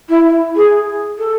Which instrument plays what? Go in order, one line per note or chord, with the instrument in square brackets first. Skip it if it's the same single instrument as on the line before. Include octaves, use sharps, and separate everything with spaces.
[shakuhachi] E4
G#4
A4